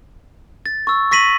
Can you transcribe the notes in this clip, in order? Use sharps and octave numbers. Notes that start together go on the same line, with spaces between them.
A6
C#6 E6
C#6 A#6 B6 D#7 F#7